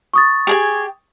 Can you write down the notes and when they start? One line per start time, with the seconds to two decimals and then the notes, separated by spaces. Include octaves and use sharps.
0.14 C#6 D#6 A6
0.47 G4 G#4 G#5